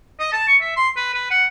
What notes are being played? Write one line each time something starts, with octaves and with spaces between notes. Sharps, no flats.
D#5
A5
C#6
E5
C6
B4
B4
F#5